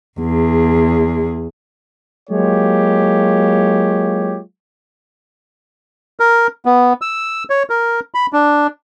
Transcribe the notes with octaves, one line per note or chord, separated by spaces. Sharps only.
E2 G#4
F#3 G#3 A#3 F4 G4 C#5
A#4
B3
E6
C#5
A#4
B5
D4